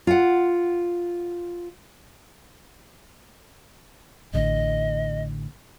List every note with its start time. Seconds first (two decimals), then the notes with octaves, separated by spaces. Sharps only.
0.07 F4 F#5
4.34 A1 D3 D#5